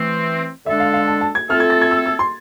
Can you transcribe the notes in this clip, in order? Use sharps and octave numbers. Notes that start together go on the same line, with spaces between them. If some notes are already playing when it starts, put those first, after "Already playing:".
Already playing: E3 A3 C4
D3 G#3 D4 A4 E5
F5
F5
A5
A5
G#6
A3 C4 F4 A4 F6
G#6
A6
G#6
E6
E6
C6